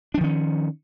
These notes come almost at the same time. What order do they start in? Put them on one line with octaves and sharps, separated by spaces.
D4 F3 D#3 C#4